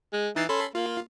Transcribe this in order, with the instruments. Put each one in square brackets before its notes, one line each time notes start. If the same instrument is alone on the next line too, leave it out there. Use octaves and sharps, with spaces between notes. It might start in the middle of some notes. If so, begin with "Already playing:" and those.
[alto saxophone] G#3
[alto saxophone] E3 [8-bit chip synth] D#4 A6 C7
[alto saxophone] C#4 [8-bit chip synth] A4 B5 C6
[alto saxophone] A#3 [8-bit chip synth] F4